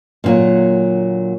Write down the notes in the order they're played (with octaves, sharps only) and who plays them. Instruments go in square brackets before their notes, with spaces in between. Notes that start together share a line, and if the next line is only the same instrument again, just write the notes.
[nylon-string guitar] A#2 D3 F3 F#3 A#3